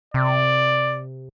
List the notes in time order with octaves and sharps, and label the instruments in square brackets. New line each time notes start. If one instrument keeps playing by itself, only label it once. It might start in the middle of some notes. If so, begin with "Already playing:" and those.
[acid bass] C3 [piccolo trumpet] D5